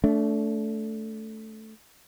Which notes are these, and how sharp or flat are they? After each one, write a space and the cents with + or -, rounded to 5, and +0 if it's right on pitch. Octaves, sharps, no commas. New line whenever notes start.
A3 +0 D4 -30